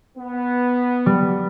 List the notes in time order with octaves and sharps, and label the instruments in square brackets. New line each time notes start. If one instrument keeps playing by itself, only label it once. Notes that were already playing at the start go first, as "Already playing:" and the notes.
[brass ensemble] B3
[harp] G3